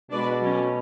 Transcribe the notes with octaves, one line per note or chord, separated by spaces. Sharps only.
B2 G#3 D4 F#4 B4 D5
F#3 A3 C#4